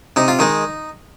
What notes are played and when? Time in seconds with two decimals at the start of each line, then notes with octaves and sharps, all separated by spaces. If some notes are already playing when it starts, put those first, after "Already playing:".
0.16 C3 D#4
0.28 F4
0.39 D#3 G#3 D#4